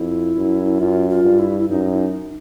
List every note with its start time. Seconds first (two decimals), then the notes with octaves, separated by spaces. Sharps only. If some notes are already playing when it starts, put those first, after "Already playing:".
Already playing: F2 E4
0.37 F#2
0.80 F#2 F4
1.10 F4
1.24 G2
1.39 E4
1.60 E4
1.69 F#2 D#4
1.95 E4
1.98 D#4